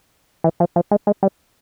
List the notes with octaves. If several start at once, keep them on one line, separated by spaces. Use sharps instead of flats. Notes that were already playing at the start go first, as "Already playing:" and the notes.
E3
F3
F3
G#3
G#3
G3